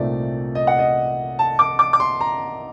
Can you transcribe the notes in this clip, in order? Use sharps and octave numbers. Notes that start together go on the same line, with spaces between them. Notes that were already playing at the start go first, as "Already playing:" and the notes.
Already playing: C2 A#2 A3 C4 D#4 D5
D#5
F#5
D#5
A5
D6
D6
D6
C6
A#5